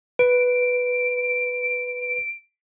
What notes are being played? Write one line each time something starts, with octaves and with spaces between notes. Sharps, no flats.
B4 D7